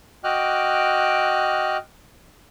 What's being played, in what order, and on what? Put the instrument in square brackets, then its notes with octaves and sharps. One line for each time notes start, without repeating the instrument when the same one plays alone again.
[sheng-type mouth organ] F#4 D#5 G5 D6 F6 F#6